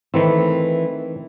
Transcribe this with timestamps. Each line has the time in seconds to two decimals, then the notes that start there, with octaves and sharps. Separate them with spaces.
0.14 D#3 E3 A3 C4